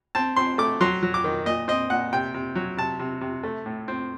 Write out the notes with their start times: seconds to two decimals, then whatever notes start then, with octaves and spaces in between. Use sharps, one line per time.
0.15 C4 A5
0.36 C4 C6
0.58 A3 D6
0.81 F#3 C6
1.03 F#3
1.14 D6
1.24 D#3
1.46 A#2 D#5
1.68 C4 D#5
1.90 A#2 F#5
2.13 C3 G5
2.34 C3
2.55 F#3
2.77 C3 A5
3.00 C3
3.21 C3
3.43 A3
3.66 A2
3.88 C4